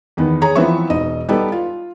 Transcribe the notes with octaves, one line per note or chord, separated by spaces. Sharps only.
E2 D#3 B3
G#4 C#5 A#5
E3 F3 B3 C4 E5 C#6
E1 D#4 D#5
G3 B3 D#4 G4 A4
F4